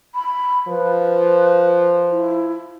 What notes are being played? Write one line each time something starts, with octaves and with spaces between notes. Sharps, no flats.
B5
F3 B4
E4